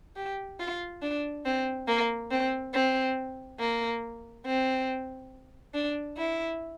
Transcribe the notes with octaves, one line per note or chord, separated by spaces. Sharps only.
G4
F4
D4
C4
A#3
C4
C4
A#3
C4
D4
E4